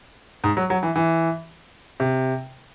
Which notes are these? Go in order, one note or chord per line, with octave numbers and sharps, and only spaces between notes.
G#2
F#3
F#3
E3
E3
C3